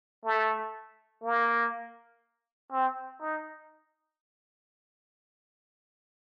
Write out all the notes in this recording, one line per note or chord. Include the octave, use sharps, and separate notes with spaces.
A3
A#3
C4
D#4